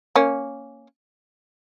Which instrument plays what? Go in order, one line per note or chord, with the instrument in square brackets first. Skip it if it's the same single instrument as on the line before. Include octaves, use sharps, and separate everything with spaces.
[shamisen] A#3 C#4